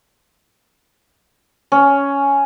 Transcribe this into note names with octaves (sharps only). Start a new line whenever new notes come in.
C#4